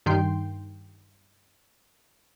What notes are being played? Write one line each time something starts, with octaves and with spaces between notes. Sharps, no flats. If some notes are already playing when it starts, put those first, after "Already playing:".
G2 D#3 G5 C6